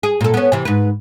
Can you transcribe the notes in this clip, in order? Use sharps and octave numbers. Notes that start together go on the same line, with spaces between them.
G#4
A#2 A4
B3 C#4
C3 E3
G#2 B4